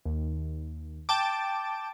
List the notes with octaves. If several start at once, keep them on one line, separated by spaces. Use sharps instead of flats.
D#2
G5 A5 D6